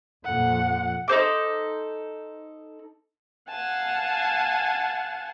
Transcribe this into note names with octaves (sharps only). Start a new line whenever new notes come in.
F2 A#2 F3 F#5
D#4 A4 C5 D6
F5 F#5 G#5 A5